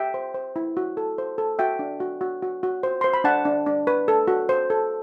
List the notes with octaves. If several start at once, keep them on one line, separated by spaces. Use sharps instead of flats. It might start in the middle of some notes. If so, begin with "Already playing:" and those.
Already playing: G4 E5 G5
C5
C5
E4
F#4
A4
C5
A4
F#4 E5 G5
D4
F#4
F#4
F#4
F#4
C5
C5 C6
B5
D4 F#5 A5
D4
D4
B4
A4
F#4
C5
A4